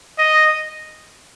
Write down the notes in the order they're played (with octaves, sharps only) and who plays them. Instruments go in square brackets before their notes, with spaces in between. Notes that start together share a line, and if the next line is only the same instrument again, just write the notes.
[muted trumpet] D#5